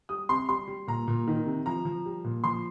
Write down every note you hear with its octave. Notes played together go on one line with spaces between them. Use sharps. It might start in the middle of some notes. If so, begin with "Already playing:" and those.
G3 D#6
C3 C6
G3 C6
G3
A#2 A#5
A#2
D#3
C3
F3 A#5
F3
G3
A#2
F3 C6